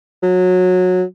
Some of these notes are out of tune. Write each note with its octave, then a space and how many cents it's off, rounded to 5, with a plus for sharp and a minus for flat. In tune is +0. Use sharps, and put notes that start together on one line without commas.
F#3 -20